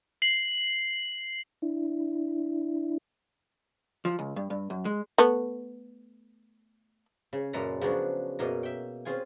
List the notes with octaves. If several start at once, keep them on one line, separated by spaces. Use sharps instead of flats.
C7 F#7
D4 E4
F3
C#2
G2
G2
F#2
G#3
A3 B3
C#3
F#2 A#2 G#3 A4 B4 A#5
C#3 F3 F#3 B3 D4 F#4
F#2 B2 A#3 G#4 D#5
E5 G5
C4 C#4 F4 G#4 G#5